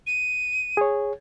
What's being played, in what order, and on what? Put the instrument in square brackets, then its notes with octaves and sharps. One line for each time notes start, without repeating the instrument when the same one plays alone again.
[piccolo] D#7
[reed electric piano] G#4 C#5